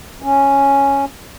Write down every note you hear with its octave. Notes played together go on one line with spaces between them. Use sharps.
C#4